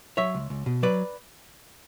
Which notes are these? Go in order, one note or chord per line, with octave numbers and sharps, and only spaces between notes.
F#3 C#5 E5
C#2
C#2
B2
F#3 B4 D5